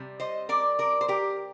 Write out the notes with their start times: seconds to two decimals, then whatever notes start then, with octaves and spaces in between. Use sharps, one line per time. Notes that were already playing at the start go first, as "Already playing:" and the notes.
Already playing: C3 G3
0.20 C5 D#5
0.49 A#4 D5
0.79 A#4 D5
1.01 C5
1.08 G4 A#4